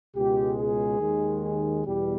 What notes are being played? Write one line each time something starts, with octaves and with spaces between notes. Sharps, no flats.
C#2 B2 G#3 G4
G#4
D#2 D#3 G#3
G#4
E2 B2 G3 G4